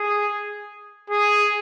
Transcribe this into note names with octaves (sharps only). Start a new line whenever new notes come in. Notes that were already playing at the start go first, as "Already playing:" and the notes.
Already playing: G#4
G#4